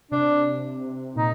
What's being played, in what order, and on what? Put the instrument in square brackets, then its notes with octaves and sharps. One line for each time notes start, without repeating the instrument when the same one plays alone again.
[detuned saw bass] C3 [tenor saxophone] D4
[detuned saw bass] A#2 [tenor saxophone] D#4